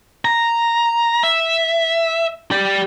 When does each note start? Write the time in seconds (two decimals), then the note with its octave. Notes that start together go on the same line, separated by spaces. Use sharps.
0.25 A#5
1.23 E5
2.51 G4 D5